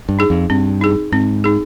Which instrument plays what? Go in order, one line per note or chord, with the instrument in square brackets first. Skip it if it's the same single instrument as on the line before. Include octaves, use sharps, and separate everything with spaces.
[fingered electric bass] G2
[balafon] D#4 G#4
[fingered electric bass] F2
[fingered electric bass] G2 [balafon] C4
[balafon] D#4 G#4
[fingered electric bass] G#2 [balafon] C4
[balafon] D#4 G#4